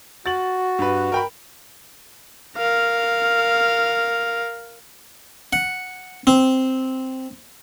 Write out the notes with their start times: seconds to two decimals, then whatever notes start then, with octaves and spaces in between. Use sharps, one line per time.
0.26 F#4 A6 F#7
0.79 G2 B4
1.12 A#4 G5 B5
2.57 A#4 F5
5.53 F#5
6.27 C4